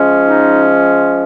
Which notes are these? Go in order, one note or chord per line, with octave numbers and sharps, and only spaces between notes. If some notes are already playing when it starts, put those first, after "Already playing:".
Already playing: F3 G#3 C#4
D#4